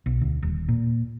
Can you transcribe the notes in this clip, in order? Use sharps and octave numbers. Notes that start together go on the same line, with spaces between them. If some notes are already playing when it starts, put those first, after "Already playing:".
B1
D2
D#1
A#2